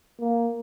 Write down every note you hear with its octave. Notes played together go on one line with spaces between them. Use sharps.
A#3